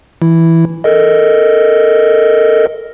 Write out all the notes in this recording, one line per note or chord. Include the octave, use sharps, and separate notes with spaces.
E3 E4
A4 A#4 D#5